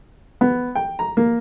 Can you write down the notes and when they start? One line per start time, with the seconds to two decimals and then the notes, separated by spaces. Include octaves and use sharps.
0.41 B3
0.75 G5
0.99 A#5
1.17 A#3